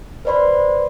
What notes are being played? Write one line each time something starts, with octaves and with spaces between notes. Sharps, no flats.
B4 C5 D5 B5 C6